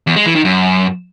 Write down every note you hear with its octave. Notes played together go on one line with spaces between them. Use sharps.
E2
G#3
E3
D#3
F#2